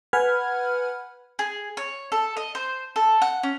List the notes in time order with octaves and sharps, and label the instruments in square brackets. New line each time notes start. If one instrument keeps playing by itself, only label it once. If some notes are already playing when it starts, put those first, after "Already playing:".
[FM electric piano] B4 F#5 G#5 B5 F6 G#6
[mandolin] G#4
C#5
A4
D#5
C5
A4
F#5
C#4